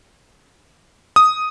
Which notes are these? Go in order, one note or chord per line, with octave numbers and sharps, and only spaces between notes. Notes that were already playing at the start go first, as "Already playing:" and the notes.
D#6